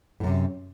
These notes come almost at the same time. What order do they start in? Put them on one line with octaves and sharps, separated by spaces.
A2 F#2 C3